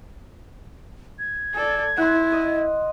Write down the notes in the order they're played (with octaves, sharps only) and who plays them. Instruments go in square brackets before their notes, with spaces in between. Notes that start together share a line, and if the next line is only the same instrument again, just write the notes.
[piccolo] G#6
[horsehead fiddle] A4 D5
[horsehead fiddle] E4 [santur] F#5 C6
[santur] D#5